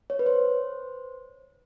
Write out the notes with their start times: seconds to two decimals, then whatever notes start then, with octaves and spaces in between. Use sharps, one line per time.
0.10 C#5
0.19 B4
0.26 C5